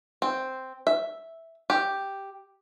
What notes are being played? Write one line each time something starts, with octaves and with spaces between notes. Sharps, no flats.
C4
E5
G4